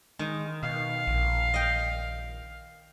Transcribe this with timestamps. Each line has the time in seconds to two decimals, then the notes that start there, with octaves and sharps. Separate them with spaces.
0.19 D#3 G#3
0.63 B2 F5
1.07 A#1
1.54 D#5 G5